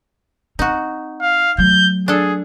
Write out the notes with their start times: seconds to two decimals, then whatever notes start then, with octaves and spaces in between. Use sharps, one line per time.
0.59 C4 D#4 F#4
1.21 F5
1.58 F#3 A3 G6
2.08 D4 G#4 A4